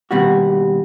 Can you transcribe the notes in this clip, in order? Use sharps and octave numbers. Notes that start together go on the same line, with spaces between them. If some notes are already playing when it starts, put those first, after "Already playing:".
D#2 B2 G3 F#4